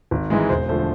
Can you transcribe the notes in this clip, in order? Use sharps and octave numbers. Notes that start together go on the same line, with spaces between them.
G#1
G#2 E3 G#3
E1 C5
D3 F3 A3 C5